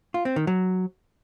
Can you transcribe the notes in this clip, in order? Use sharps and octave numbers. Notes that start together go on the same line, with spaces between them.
F4
C4
D#3
F#3